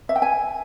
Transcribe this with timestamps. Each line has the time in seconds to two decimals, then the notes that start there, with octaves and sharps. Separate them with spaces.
0.09 E5
0.16 G5
0.22 G#5